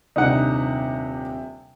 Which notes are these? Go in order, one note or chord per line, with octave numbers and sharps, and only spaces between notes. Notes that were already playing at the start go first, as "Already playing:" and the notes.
D#1 C3 D4 D#4 F#5